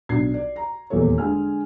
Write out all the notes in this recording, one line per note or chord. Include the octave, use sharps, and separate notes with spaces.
B1 D4 G#6 C7
D5
A#5
D#1 E2 A#3 A4 C#5
D3 G#3 G#5 F6